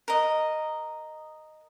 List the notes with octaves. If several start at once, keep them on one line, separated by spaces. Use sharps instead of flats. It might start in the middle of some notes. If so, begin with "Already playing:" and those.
A#4 D#5